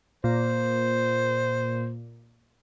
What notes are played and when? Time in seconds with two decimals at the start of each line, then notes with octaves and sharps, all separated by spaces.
0.24 A#2 C5